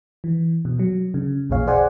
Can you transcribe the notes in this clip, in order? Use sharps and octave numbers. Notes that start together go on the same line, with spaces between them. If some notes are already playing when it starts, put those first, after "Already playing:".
E3
B2
F#3
C#3
A#1 E2 A#2 G#4 C#5 F5
G#4 C5 D5 F#5 G#5